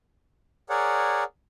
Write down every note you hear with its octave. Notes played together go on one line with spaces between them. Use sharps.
G#4 A#4 C#5 D5 F#5